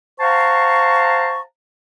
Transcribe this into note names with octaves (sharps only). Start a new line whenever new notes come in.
C5 F5 F#5 A5 A#5 C#6